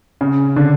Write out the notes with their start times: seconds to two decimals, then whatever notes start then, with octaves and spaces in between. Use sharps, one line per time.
0.21 C#3
0.56 D3